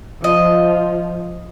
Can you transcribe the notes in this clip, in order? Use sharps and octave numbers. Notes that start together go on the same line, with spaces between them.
F3 D#5